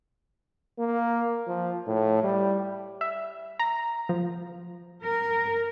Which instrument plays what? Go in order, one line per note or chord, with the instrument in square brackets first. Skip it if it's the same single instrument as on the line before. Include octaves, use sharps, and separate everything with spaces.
[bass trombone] A#3
F3
A2
G3
[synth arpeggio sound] E5
A#5
F3
[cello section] A#4